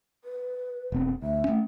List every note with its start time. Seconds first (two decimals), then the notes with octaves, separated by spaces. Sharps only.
0.24 B4
0.92 E1 B3 C4
1.22 D2 E5
1.44 A3 C#4